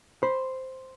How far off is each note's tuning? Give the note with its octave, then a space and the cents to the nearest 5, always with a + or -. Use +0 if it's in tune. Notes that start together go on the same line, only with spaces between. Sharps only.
C5 +0 B5 -10